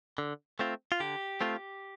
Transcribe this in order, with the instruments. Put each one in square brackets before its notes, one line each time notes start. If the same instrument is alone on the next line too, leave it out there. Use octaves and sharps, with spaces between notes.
[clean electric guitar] D3
A3 C4 F4
F4
D3 G4
A3 C4 F4